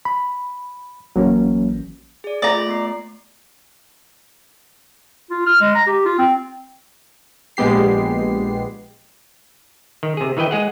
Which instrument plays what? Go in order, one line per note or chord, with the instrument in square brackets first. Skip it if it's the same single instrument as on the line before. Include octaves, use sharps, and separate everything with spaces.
[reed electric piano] B5
[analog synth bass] A1 [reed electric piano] F#3 A#3 C#4
[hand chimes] G#4 D5
[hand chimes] A3 F4 [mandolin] D5 A#5
[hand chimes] A3 B3 C7
[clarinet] F4
F6
G#3
A#5
G4
F4
C4
[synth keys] A#1 G#3 B3 G4 C7
[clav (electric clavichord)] D#3
C3 G#4
D#3 E3 B4 D#5 G5
G#3 G#4 F#5